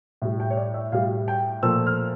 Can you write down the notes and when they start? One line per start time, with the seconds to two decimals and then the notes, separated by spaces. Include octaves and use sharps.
0.22 A2 G3
0.40 G5
0.50 C#5
0.57 D5
0.74 E5
0.92 A2 G3 F5
1.28 G5
1.63 A#2 F3 A3 E6
1.87 F6